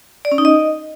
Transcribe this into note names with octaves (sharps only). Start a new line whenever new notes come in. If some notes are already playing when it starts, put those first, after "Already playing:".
D5
C#4
D#4
D#5